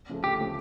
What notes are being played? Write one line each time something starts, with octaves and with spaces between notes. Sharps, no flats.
C#3 F3 A3
D2 G4
C#3 F3 A3